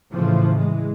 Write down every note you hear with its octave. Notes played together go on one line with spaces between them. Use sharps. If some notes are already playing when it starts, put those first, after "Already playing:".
A2 C#3 E3 F3
E3 G#3